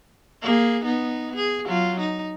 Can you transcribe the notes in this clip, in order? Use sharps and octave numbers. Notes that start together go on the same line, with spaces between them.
A#3 G#4
B3 D#4
G#4
F#3 F4
D#4